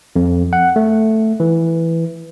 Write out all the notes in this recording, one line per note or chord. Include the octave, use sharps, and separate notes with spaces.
F2
F#5
A3
E3